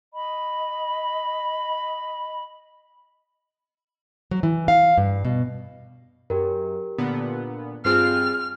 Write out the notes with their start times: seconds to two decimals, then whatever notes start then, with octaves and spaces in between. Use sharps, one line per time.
0.14 D#5 B5
4.31 F#3
4.43 E3
4.68 F5
4.97 G2
5.25 B2
6.30 F#2 G4 A#4
6.98 A#2 D3 B3
7.85 G2 C4 F4 G#4 F6 C7